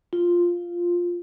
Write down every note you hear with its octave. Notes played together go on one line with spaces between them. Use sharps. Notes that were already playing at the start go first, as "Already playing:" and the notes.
F4